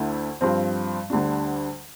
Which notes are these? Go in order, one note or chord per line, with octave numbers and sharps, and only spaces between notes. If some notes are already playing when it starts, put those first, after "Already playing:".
Already playing: D2 D3 A3 E4
G2 F3 C4
D2 D3 G3 D4